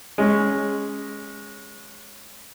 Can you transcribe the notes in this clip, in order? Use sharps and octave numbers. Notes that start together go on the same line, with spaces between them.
G#3 C#4